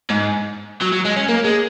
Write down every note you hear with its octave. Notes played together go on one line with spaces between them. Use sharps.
G#2
F#3
F#3
G#3
C#4
A#3
G#3